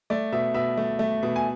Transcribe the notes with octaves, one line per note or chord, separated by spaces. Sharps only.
A3 D5
B2 E5
B2 E5
A3
A3
B2
G#5